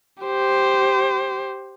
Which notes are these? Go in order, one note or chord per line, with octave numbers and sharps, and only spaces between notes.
G4 C5